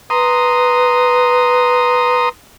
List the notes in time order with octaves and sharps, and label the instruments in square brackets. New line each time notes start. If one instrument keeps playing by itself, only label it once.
[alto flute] B4 [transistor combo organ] A#5 C6 D#6